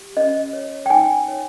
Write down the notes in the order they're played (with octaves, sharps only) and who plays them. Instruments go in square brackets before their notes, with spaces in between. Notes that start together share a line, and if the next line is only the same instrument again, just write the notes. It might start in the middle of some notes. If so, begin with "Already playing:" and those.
Already playing: [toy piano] G4
C#4 D#5
C#5
G5
D#4 G#5
C#5